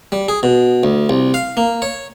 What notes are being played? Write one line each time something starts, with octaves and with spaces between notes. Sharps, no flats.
G3
G#4
B2
D2
C2
F5
A#3
C#5